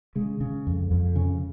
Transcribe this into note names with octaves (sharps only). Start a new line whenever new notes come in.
C#3 G#3
C#3
F2
F2
C#3